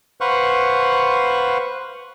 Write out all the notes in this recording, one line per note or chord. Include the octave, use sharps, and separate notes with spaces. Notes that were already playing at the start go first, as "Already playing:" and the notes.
B4 C5 F5 F#5 C#6